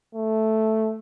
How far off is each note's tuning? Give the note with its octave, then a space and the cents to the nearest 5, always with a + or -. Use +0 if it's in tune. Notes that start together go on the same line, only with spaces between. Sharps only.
A3 +0